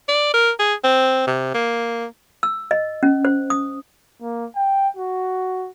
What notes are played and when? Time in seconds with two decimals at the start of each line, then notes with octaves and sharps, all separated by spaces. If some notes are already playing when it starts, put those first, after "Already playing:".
0.08 D5
0.34 A#4
0.59 G#4
0.84 C4
1.27 C3
1.54 A#3
2.43 E6
2.71 D#5
3.03 C#4
3.25 C5
3.50 D#6
4.22 A#3
4.56 G5
4.97 F#4